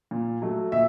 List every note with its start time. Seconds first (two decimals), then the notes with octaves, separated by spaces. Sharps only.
0.11 A#2
0.42 F#3 A3
0.72 A#2 E5